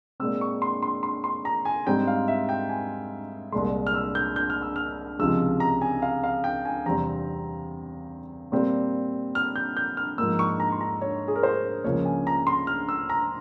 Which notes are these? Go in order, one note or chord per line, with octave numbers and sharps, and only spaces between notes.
A#2 G#3 C4 E6
C#6
C6
C6
C6
C6
A#5
G#5
G#2 G3 C4 G5
F5
E5
G5
G#5
C2 A#2 G#3 C6
F6
E6
G6
G6
F6
E6
F6
C#2 C3 F3 G#3 E6
A#5
G#5
F5
F5
G5
G#5
E2 C3 G3 C4 A#5
A#2 G3 C4
F6
G6
G6
F6
G#2 F3 A#3 E6
C#6
A#5
C6
A#5
C#5
G#4
A#4
C5
C#2 C#3 F3 A#3 C#5
G#5
A#5
C6
F6
E6
A#5